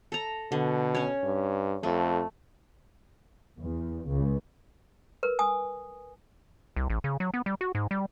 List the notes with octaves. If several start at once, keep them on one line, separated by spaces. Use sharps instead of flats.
A4 A#5
B2 D3
C#4 C#5
G2
F2 A3
E2
C#2
A#4 B4
G#5 D#6
C2
A1
C#3
F#3
B3
G3
F#4
G#2
G3